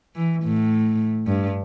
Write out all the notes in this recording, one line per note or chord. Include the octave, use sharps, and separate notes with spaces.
E3
A2
G2